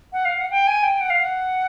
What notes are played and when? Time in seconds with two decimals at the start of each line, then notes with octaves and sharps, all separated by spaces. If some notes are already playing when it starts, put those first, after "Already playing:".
0.13 F#5
0.25 F5
0.38 F#5
0.51 G5
0.67 G#5
0.83 G5
1.01 F#5
1.10 F5
1.20 F#5